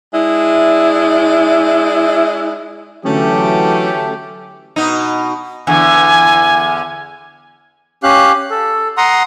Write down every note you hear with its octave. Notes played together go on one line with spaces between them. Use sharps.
G#3 D4 E4
D3 E3 F#3 A3 C#4 G4
B2 D#4
E2 D3 G#5
C#4 G4 F5 F#6
A4
F#5 A#5 C6 D#6